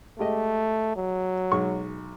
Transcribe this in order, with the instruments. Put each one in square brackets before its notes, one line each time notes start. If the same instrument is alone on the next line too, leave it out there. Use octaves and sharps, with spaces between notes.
[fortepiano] G#3 G4 D#5 [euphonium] A3
[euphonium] F#3
[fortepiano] B1 G#3 C#6